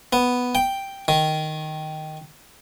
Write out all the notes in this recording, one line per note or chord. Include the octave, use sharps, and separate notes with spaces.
B3
G5
D#3